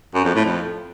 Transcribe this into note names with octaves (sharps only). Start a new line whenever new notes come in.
F#2
F2
A2
F2